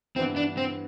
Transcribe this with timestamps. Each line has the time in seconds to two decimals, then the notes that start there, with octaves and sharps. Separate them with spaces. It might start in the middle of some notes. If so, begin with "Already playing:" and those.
0.16 G2 E3 B3 C4 E4
0.36 D4
0.57 C4